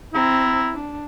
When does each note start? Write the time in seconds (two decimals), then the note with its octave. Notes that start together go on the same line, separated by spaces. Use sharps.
0.14 C4 E4 A#5
0.74 D4